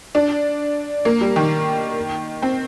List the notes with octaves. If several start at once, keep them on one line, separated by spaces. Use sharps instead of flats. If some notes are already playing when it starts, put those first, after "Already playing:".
D4
A#3
G3
D#3
C4